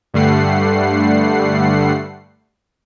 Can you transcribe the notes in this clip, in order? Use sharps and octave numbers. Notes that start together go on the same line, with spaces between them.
G2 D3 G3 A3 F#5 C7